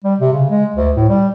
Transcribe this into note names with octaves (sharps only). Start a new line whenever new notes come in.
G3
C3
C#3
G#3
D2
A2
G3